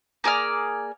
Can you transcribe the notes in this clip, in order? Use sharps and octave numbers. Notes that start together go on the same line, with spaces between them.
A#3 G#4 D5 F6